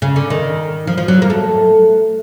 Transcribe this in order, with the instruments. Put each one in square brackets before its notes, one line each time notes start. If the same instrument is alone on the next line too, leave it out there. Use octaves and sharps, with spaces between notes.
[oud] C#3
D3
D#3
F3
F3
F#3
A#3
A3